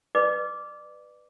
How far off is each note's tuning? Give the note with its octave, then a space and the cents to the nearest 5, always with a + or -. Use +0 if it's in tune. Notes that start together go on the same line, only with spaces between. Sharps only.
B4 +0 D5 +30 D6 -10